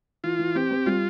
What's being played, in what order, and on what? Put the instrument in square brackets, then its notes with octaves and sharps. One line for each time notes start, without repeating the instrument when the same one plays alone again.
[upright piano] E3 [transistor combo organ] F4
[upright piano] E3
[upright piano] C4 [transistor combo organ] G4
[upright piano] C4
[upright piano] G3 [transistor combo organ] F4